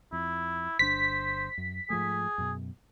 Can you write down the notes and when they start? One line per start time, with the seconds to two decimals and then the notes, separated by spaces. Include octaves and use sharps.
0.13 F2 E4
0.79 G1 D4 C5 B6
1.58 F#2
1.90 G#2 F3 A3 G#4
2.38 F#2 B2